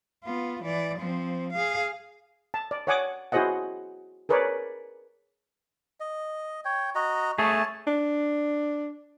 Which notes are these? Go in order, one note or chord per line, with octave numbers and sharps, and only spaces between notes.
B3 F4
E3 D5
F3 C4
G#4 F5
A5
D5
C#5 D5 F#5 G#5 D6 D#6
E4 F#4 G#4 C5 D#5 F#5
G#4 A#4 B4 C#5 D5
D#5
C#5 G5
F#4 D#5 A#5
A3 G#4 C#5 A5
D4